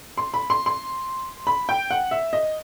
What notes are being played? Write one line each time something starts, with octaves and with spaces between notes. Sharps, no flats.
C6
B5
C6
C6
B5
G5
F#5
E5
D#5